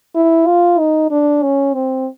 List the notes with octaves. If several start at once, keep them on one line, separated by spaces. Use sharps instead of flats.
E4
F4
D#4
D4
C#4
C4